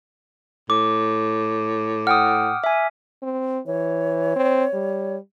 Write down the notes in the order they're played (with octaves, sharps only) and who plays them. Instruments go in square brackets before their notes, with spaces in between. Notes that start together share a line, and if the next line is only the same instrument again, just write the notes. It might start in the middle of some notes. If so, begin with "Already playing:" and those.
[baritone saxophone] A2 [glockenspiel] D6
[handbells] F#5 G5 D#6 [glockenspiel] F6
[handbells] E5 G#5
[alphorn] C4
[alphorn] E3 [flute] C#5
[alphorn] C4
G3